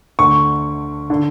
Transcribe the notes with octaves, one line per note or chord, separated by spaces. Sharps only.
D2 D3 C#6
D3